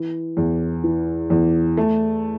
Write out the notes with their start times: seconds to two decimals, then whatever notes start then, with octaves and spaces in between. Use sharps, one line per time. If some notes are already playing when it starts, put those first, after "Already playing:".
Already playing: E3
0.37 E2
0.84 E3
1.30 E2
1.77 A3